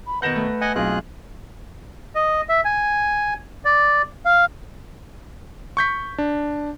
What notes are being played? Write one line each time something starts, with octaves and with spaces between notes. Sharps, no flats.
B5
B2 D#3 B4 F#5 G6 A#6 E7
A3
D#5 F#5 G#5
B1 C4 F4 G#4 F#6
D#5
E5
G#5
D5
F5
C#6 G6 B6
D4